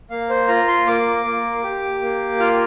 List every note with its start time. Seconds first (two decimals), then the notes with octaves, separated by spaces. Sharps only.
0.10 A#3 F5
0.30 C5
0.48 F4 A#5
0.68 C6
0.86 A#3 D6
1.25 A#3
1.63 G4
2.01 A#3
2.39 F4 F6